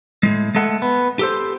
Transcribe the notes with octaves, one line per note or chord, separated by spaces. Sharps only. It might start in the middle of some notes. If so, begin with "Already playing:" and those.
A2 G#3
G#3 A3 A4 F#5
B3
G4 A4 C5